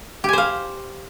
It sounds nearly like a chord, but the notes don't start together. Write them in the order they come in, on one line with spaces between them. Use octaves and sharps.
G4 G#5 C5 F5